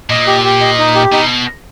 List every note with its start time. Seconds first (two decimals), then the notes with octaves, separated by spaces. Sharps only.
0.10 A#2 D#5
0.27 G4
0.44 G4
0.61 D#5
0.78 D#4
0.95 G4
1.12 B2 D#4